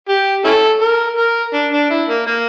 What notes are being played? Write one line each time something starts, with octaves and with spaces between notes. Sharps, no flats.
G4
C#4 E4 A4
A#4
A#4
D4
D4
E4
A#3
A#3